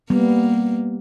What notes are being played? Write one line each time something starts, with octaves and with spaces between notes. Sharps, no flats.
G3 A#3 B3